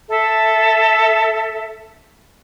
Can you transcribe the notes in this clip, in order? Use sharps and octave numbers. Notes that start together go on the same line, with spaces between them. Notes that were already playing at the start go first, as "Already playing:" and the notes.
A4 E5